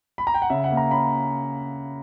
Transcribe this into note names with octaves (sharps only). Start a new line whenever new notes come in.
B5
A#5
G5
F#5
C#3 E5
F#5
A#3
A#5
C#4 B5